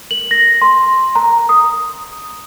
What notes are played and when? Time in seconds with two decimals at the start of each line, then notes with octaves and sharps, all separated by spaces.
0.11 F#7
0.31 A#6
0.62 C6
1.15 A#5
1.49 D#6